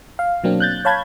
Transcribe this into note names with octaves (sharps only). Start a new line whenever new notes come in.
F5
B2 F#3 A#3 C4 D4
F#6 G6 A6
C#5 F5 A5 B5 G6 G#6